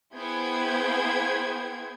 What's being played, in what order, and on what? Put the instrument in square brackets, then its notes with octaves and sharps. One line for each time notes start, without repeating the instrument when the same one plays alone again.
[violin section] B3 E4 G#4 C5 G5 G#6